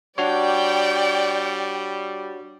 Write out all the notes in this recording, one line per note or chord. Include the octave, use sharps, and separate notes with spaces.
G3 D4 F#4 C#5 D5 G5